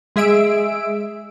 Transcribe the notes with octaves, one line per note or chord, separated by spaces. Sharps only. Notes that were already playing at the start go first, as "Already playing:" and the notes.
G#3 G#4 E5 E6 D7